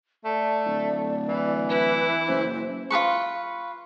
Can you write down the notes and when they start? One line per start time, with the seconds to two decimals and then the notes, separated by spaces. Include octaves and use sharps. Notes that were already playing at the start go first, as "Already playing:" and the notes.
0.25 A3 D5
0.66 D1
1.28 E3
1.69 E4 B4
2.28 F#1 C5
2.90 F4 G#4 B4 C#6